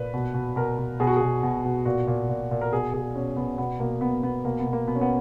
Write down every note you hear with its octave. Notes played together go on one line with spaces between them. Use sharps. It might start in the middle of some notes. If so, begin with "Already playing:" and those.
Already playing: A#2 B4
B2
B2
B2 A#4
B2
B2 G#4
F#4
B2 G#4
B2
B2
A#2 F#4
A#2
A#2
A#2
A#4
B2 G#4
B2 G#4
B2 C#4
B2 B3
B2 B3
B2 A#3
B2 B3
B2 B3
B2 A#3
B3
B2
A#3
B2 B3
C#4
B3